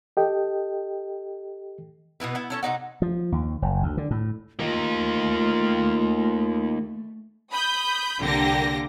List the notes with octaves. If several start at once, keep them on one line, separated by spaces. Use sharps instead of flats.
G4 A4 D#5 G5
B2 B3 E4 B4
B3 E4
C#4 A4 C#5
C3 D4 D#4 F#5
F3
D#2
F#1
D2
D3
A2
A3 A#3 D#4 F4
B5 D#6 G6
C2 D3 A#3 G4 A#6